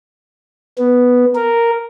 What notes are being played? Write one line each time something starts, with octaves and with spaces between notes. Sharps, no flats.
B3
A#4